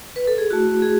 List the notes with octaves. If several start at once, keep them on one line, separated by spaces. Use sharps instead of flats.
B4
A4
G#4
A3 E4 F#4
G#4